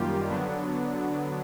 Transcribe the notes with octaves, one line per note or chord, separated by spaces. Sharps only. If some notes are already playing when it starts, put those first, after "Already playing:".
Already playing: F#2 D#3 G3 A#3 F4 G4
D3 F#3 B3 D4